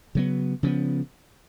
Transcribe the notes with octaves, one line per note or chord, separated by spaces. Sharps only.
C#3 F#3 B3
C#3 F3 B3